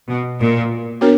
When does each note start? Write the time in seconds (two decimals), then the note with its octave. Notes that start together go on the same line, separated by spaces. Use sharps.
0.08 B2
0.40 A#2
1.01 B3 D4 F#4 A#4 C#5